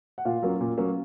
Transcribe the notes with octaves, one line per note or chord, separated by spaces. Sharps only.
F#5
A#2 F4 F5
F#3 A#3 C#4
A#2
F#3 A#3 C#4